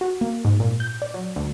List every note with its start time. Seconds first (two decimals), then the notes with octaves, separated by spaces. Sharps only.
0.01 F#4
0.21 A#3
0.45 G#2
0.60 A#2
0.80 G6
1.02 D5
1.14 F#3
1.36 D2